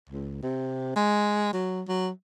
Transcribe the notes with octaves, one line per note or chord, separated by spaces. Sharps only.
C#2
C3
G#3
F#3
F#3